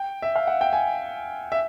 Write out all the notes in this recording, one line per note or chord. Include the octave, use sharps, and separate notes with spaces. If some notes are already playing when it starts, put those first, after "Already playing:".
Already playing: G5
E5
F5
F#5
G5
G#5
E5